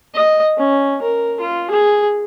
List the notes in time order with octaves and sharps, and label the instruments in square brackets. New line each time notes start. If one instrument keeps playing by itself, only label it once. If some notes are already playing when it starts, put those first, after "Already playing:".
[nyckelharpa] D#5
C#4
A#4
F4
G#4